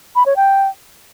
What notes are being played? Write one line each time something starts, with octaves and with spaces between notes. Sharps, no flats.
B5
C#5
G5